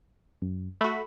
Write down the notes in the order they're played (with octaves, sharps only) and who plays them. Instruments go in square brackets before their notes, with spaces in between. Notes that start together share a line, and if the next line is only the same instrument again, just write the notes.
[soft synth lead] F#2
[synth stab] A3 F#4 [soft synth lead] B5